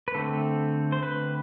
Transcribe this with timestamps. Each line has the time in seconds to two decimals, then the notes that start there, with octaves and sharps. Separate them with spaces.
0.08 B4
0.15 D3 A3 C4 A4
0.92 C5
1.03 B4